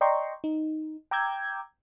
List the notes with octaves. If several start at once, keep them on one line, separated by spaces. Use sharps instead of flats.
D5 D#5 G5 A#5 C6 C#6
D#4
G5 A#5 D6 E6 G6 G#6